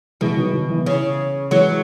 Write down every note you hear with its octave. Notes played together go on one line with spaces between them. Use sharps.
B2 E3 G#3
D#3 F#3
D#3
E3
C#3
E3 F#3 G#3